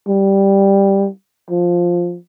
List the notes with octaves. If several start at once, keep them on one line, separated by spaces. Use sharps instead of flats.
G3
F3